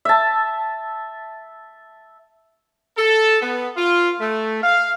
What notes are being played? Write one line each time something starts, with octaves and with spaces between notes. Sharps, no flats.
E5 A5
A4
B3
F4
A3
F5